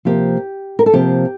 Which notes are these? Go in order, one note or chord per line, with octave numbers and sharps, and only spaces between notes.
C3 F3 A#3 G4
A#4
A4
C3 F3 A#3 G4